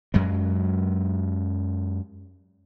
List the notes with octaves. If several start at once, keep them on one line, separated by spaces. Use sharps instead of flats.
F#2 F#3 G#3